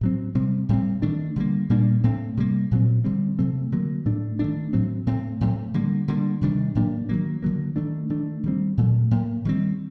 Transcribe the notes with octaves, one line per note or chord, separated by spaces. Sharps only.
A2 F#3 C4
C3 G3 C4
A2 G3 C4
D#3 A3 D4
D3 G3 A#3
A#2 G3 A#3 D4
A2 A3 C4
C3 G3 A#3
A#2 F#3 C4
D3 G3 C4
C3 F#3 A3 C4
D3 F#3 A#3
A2 A3 D4
D#3 A3 D4
A2 F#3 C4
A2 A3 C4
A2 F#3 A3 C4
D3 G3 A#3
D3 G3 A#3 D4
C3 D#3 G3 D4
A2 F#3 A#3 D4
D#3 F#3 A#3
D3 F#3 A#3
D#3 A3 D4
D#3 A3 D4
D#3 G3 C4
A#2 F#3 A3
A2 F#3 A#3
D#3 G3 C4